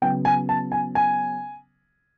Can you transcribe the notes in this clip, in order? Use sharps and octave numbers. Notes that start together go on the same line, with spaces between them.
C#3 F#3 B3 G5
G#5
A5
G#5
G#5